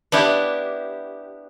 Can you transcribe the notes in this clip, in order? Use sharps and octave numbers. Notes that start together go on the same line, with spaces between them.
B3 D4 E4 G4